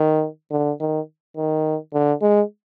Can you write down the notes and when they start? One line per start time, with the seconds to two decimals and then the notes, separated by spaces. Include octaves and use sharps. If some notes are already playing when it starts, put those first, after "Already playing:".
Already playing: D#3
0.51 D3
0.80 D#3
1.36 D#3
1.93 D3
2.22 G#3